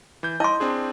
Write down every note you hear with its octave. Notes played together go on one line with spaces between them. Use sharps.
E3 G6
E4 D#5 C6
C4 D4 G#4